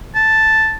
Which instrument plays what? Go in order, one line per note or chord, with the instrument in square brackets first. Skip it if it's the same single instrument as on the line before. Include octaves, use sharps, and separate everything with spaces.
[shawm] A5